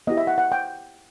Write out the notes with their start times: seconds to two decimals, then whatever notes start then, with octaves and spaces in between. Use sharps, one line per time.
0.07 B3 E4 G4 D#5
0.17 E5
0.27 F#5
0.38 F#5
0.52 G5